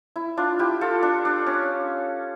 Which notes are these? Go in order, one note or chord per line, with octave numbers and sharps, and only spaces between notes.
E4
D4 F4
E4 G4
F4 A4
D4
D4
C#4